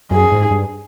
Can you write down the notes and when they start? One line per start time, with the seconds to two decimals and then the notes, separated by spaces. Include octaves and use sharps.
0.11 F#2 G#4
0.32 G#2
0.51 G2